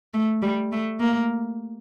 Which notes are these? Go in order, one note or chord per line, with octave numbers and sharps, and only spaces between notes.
A3
G3
A3
A#3